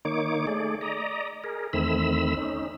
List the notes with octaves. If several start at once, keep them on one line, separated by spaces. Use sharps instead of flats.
D#3 A#3 D#4 C#5 D6
A3 G#4 D5
D5 D#5 A#5
G#4 A#4
E2 D#3 A3 C4 B5 E6
C#4 D#4